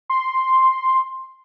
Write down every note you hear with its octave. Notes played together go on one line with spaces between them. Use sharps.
C6